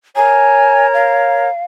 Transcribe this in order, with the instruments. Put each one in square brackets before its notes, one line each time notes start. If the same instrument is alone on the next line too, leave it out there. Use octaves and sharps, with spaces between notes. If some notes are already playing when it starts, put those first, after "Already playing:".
[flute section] A#4 C#5 A#5 [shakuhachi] G#5
[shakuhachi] F5